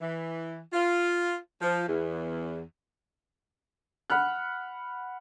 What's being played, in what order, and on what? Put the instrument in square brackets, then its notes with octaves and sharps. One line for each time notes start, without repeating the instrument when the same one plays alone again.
[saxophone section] E3
F4
F3
E2
[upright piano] F#5 B5 F6 F#6